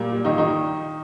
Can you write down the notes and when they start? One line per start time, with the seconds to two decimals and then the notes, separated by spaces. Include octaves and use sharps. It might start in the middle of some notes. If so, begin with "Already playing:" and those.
Already playing: A#2 G3 A#3
0.12 G3
0.25 D#3 D#4
0.38 D#3 D#4